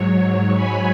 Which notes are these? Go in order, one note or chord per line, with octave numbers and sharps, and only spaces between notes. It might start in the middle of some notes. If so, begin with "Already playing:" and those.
Already playing: G#2 F#3 C#5
G#5 B5